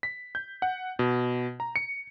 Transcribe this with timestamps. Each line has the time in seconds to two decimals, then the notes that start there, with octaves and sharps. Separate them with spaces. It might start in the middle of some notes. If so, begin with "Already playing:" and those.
0.03 B6
0.35 G6
0.62 F#5
0.99 B2
1.60 A#5
1.76 C#7